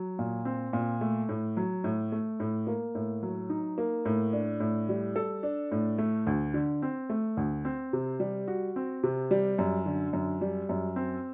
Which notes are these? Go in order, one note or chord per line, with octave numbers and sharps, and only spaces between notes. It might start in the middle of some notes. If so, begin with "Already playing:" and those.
Already playing: F#3
A#2
C4
A#2
A3
A2
F#3
A2
A3
A2
A#3
A2
F#3
D#4
A#3
A2
D4
A2
G3
A4
D4
A2
A3
D2
D3
C4
A3
D2
C4
C3
G3
F#4
C4
C3
G3
F#2
D3
F#2
G3
F#2
C4